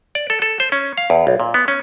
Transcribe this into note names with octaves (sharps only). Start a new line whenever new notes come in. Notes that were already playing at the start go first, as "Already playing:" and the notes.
D5
A4
A4
C5
C#4
F5
E2
B1
A#2
B3
C#4